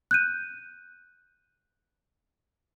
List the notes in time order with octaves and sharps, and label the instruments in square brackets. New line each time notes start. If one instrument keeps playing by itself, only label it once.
[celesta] F#6 G6 D#7